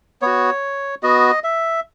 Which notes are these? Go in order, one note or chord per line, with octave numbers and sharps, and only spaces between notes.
B3 F#4 C#5
B3 F#4 D#5
E5